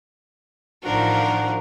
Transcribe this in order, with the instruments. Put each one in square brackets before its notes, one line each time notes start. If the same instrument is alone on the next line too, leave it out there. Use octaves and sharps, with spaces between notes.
[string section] A1 F4 [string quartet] D#3 F3 D4 [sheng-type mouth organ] F#4 [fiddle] A#4